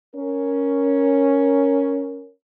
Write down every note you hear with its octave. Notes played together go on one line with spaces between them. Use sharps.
C#4 A#4